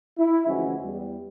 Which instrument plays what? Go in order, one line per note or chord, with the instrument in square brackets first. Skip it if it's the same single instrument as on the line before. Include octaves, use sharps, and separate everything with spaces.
[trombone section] E4
D2 E3 F3 G#3 C#4 F#4
E2 G3